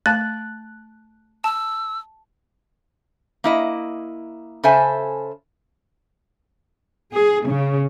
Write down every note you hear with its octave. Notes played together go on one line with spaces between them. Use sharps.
A3 A5 F#6 A6
A5 E6
A#3 E4 D#5
C#3 A4 C5 E5 G#5
G#4
C#3